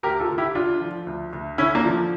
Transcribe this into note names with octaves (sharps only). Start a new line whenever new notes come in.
D2 G4 A#4
F4 A4
D2
E4 G4
D3 D4 F4
F3
D2
D2
D3 C#4 E4
A#3 D4
F3